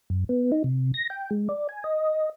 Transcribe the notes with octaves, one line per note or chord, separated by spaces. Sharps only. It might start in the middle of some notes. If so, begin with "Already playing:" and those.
F#2
B3
D#4
C3
A#6
G5
G#3
D5
G#5
D#5